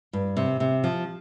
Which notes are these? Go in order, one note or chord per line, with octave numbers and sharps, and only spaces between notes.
G2
C3
C3
F3